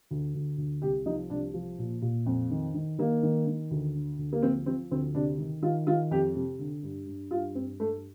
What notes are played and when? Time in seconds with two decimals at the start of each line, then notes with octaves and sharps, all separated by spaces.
0.11 D2
0.35 D2
0.58 D2
0.82 C2 G4
1.06 F3 D#4
1.30 C2 D4
1.54 F3
1.79 A#2
2.02 A#2
2.26 F2
2.51 D#3
2.74 D#3
2.99 D#3 A#3
3.23 D#3
3.47 D#3
3.71 D2
3.94 D3
4.18 D2
4.33 A#3
4.42 F3 C4
4.66 F3 C4
4.91 D2 C4
5.15 C3 D4
5.38 D#3
5.62 D#3 F4
5.87 D#3 F4
6.11 F2 G4
6.35 C3
6.59 D3
6.83 G2
7.06 G2
7.31 G2 F4
7.55 G2 C4
7.79 G2 A3